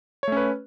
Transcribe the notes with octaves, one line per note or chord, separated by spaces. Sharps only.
A3 C#4 B4 C#5